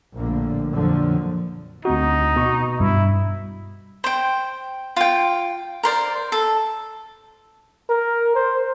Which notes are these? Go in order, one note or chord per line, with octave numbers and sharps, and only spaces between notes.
A#1 A2 D3 A#3
F2 A#2 D3 F3 F#3
D2 C4 D#4 F#4
B2 C#6
G2 E4
C5 G5
F4 G5
A#4 C5 D5
A4
A#4
C5